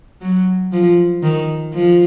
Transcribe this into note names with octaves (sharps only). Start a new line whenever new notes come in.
F#3
F3
D#3
F3